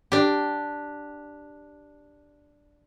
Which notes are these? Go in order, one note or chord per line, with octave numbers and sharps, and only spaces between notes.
D4 G4